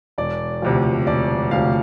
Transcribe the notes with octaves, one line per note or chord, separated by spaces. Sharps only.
E1 D5
D2 C3 F3
E1 D5
D2 C3 F3 F5